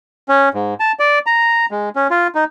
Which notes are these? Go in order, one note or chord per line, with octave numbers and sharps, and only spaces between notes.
C#4
G#2
A5
D5
A#5
G#3
C#4
F4
D#4